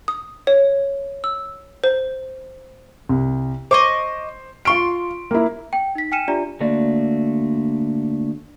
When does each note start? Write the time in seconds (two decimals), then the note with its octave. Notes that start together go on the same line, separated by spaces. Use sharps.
0.08 D#6
0.47 C#5
1.24 E6
1.84 C5
3.09 C2
3.71 C5 D#5 C#6 D6
4.65 F4 C6 C#6 F6 D7
5.31 A#3 E4
5.73 G5
5.95 D#4 B6
6.12 G5 G#5 F6 C#7 D#7 E7
6.28 D4 F4 G4 D5 E5 A#5
6.60 D3 A3 A#3 F#4 D5